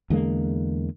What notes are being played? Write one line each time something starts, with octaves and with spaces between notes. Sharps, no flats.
E2 D3 G#3 A#3